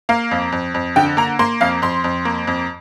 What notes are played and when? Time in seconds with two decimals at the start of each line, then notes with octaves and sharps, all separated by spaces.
0.09 A#3 F5
0.31 F2
0.52 F2
0.74 F2
0.96 D3 G5
1.17 A#3 A#5
1.39 A#3 C6
1.61 F2 F5
1.82 F2 C6
2.04 F2
2.25 A#3
2.47 F2